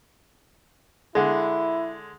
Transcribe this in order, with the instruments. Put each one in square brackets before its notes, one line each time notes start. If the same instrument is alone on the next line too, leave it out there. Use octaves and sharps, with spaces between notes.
[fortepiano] D3 G#3 [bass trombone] E4